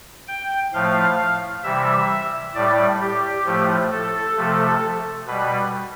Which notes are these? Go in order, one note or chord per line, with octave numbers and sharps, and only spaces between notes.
G5
A2 F3 A3 F5
C3 E3 G3 E5
A2 G3 D5
G4
A2 F3 A3
A4
C3 F3 A3
B2 G3 B4